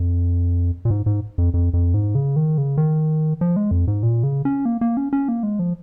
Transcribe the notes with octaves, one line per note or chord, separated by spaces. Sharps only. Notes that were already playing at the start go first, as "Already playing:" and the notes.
Already playing: F2
A#2
G#2
G#2
F2
F2
F2
G#2
C#3
D#3
C#3
D#3
F3
G#3
F2
G#2
A#2
C#3
C#4
A#3
A#3
C#4
C#4
A#3
G#3
F3